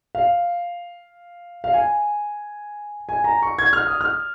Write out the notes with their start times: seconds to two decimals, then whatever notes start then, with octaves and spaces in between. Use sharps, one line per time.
0.15 F5
1.64 F5
1.73 G#5
3.09 G#5
3.24 A#5
3.42 C#6
3.59 G#6
3.73 F6
3.87 D#6
4.01 F6